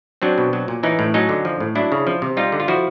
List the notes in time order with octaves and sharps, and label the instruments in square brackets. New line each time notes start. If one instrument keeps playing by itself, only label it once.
[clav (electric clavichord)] F#3 C4 D4
B2
F#3
A#2
E3 C#4 D#4
A2
F#3 C#4 D#4
D3
F3
A2
F#3 D4 E4
C#3
F3
C3
G3 D#4 F4
D3
F4
F3 E4 F#4